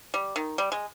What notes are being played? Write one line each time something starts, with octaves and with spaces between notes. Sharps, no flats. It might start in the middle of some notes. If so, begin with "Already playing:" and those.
G3
D#3
G3
G#3